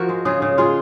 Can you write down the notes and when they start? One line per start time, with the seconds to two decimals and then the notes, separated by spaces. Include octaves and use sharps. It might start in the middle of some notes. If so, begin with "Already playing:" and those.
Already playing: F3 F#4 A#4
0.09 G#3
0.25 C#3 F4 G#4
0.42 C#3
0.58 G#3 F4 G#4